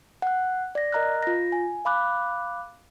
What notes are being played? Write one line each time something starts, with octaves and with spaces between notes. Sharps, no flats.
F#5 F#6
D5 A#6
A#4 D#5 A#5 F6 F#6
F4 A#6
G#5
F5 B5 D6 F#6